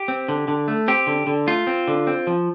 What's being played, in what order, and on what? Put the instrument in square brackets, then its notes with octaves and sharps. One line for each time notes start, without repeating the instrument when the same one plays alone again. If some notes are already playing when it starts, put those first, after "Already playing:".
Already playing: [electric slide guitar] G4
C4
D3
D3
A3
C4 G4
D3
D3
A3 F4
C4
D3
C4
F3